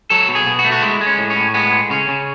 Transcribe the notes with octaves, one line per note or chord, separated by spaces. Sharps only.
F#3 A4
B2
G#4
B2
F#4
A3
F#4
G#3 E4
G#3
C#4
A2
C#4
A2
G#3 B3
G#3
C#3 C#4
C#3